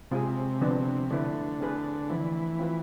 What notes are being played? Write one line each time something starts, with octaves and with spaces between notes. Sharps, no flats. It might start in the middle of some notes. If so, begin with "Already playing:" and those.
C3 G#3 C4 F4 G#4
D3 F3 B3 D4
D3 A3 E4 B4
C4 G#4 B4
E3 F3 A3 C4
C4 F4 B4